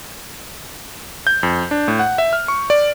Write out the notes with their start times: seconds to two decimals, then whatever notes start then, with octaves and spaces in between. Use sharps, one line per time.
1.27 G6
1.43 F2
1.71 D4
1.88 A2
1.99 F#5
2.18 E5
2.33 F6
2.48 C#6
2.70 D5